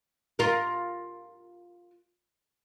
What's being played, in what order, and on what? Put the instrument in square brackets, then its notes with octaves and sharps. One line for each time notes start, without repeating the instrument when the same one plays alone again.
[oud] F4 A#4